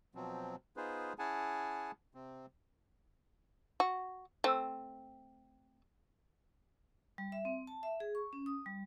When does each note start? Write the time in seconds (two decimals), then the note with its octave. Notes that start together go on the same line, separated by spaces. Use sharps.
0.15 B2 F3 F#3 C4
0.77 B3 D#4 F4 G#4 B4 C5
1.19 C#4 E4 G#4 F#5 G#5 A5
2.15 C3 C4
3.80 F#4
4.44 A3 C4
7.18 G3
7.32 E5
7.45 C4
7.67 A5
7.83 E5
8.00 G#4
8.15 C#6
8.33 C#4
8.46 D#6
8.66 G3